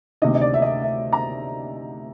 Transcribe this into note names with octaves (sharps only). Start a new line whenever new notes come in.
D2 C3 D#3 D#5
D#5
D5
E5
D#5
E5
A#5